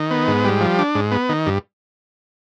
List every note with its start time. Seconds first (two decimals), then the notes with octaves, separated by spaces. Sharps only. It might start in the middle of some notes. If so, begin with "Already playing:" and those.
Already playing: D#3
0.11 B3
0.28 G#2
0.44 G3
0.61 F3
0.79 D4
0.95 G#2
1.11 B3
1.29 D#3
1.46 G2